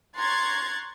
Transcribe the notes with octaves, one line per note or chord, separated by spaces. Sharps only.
A#5 C6 C#6 F#6 G#6 A6